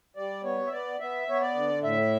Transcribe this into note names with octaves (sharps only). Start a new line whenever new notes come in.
G3 D5
B3 C#5
E5
B3 D5
B3 E5
B3 C#5
D5
D3
A2 E5